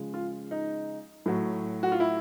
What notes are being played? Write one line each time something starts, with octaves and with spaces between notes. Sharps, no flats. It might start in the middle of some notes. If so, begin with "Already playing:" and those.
Already playing: C#3 F3 G#3
F4
D#4
A2 F#3
F#4
F4
E4